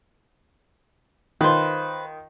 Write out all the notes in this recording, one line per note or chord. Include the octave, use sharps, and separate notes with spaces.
D#3 F4 B4 C5